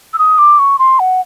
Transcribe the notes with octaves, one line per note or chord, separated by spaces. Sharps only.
E6
D#6
D6
C#6
C6
F#5